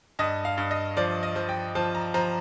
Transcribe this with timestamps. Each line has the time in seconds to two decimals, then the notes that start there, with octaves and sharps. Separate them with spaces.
0.19 G2 D#5
0.45 F5
0.57 G2
0.71 D#5
0.97 F3 D5
1.23 D#5
1.36 F3
1.49 G5
1.75 F3 A5
1.95 A#5
2.14 F3 A#5